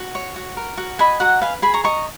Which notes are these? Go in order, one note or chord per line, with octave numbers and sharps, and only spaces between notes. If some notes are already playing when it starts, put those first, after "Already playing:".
Already playing: F#4
C#5
F#4
A#4
F#4
D#5 G#5 B5
F#4 F#5 A#5
B4 F5 G#5
G#4 G#5 B5
A#5 C#6
D#5 A#5 C#6